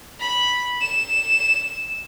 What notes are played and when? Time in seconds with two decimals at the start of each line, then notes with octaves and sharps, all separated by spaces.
0.20 B5
0.81 E7